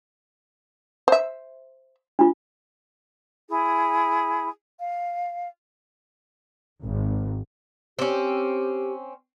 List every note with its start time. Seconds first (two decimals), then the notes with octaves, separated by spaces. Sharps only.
1.08 C5 E5
2.19 D4 F4
3.49 E4 G#4
4.80 F5
6.83 G#1
7.99 C4 C#4 G4